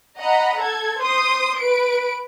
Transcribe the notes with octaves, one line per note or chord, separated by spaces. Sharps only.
D#5 F#5 A#5 B5
A4 G#6
C5 C6 D#6
B4 D7